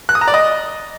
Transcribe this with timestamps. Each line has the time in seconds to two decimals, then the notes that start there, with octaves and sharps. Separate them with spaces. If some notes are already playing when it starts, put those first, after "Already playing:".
0.09 F#6
0.15 D#6
0.21 A#5
0.28 D5
0.34 D#5